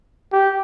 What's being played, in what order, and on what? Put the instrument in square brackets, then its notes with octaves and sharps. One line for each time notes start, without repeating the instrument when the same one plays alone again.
[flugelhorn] G4